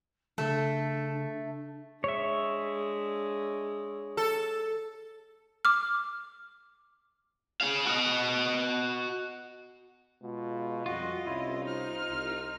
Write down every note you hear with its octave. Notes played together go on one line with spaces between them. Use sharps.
C#3 A3 D4 A4
G#3 D4 C#5 E5
A4
D6 F6
G#4 F5
F#4 D#5
B2 G#3 F4
F2 G3 F4 F#4 D#5
C2 C#4 E4
D#4 C5 F6
C2